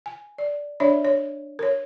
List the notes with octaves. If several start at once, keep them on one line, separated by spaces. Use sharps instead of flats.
G#5
D5
D4 C#5 D5 E5
C#5
A#4 C#5